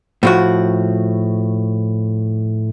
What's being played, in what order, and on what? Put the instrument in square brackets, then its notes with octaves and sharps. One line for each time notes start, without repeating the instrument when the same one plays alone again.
[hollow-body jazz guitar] A2 F3 F#4